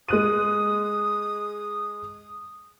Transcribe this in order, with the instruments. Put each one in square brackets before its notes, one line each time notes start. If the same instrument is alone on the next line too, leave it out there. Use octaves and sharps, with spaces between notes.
[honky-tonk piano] G#3 F#6 D#7 [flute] D#6